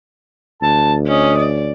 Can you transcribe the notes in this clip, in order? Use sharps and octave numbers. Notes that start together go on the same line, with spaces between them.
D2 A5
C#4 D#5
D5